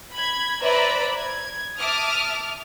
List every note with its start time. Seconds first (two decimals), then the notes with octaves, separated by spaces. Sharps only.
0.13 B5 G#6
0.61 B4 C5 D5 E5 A#5 B5
1.17 G#6
1.78 E5 A5 D6 D#6 F6